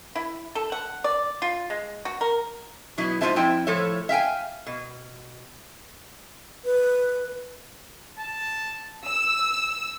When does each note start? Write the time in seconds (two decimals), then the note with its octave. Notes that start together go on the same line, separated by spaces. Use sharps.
0.15 E4
0.55 A4
0.72 F#5
1.04 D5
1.42 F4
1.70 G#3
2.05 F#4
2.21 A#4
2.97 B2 F#3 B3 E4
3.21 G#2 G#3 F4 C5 E5 A5
3.36 F2 E4 G5
3.67 A2 F3 A4 C#5 E5
4.09 E5 F5 G5 G#5
4.67 B2
6.65 B4
8.19 A5
9.06 E6